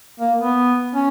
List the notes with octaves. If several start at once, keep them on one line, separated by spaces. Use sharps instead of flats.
A#3
B3
C#4